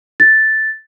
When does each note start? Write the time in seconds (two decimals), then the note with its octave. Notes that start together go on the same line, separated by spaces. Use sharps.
0.20 A6